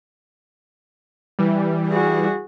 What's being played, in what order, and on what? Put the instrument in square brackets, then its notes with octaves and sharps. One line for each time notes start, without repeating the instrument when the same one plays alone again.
[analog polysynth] E3 G3
[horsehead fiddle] F#4 G#4